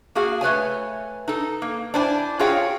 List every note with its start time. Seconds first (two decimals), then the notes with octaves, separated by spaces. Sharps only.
0.15 A#3 F#4 G#4 F5
0.41 A3 B4 C#5 G#5
1.28 D#4 A4
1.62 A#3
1.94 D4 E4 C5 D5 G#5
2.39 F4 F#4 G#4 C#5 F5 G5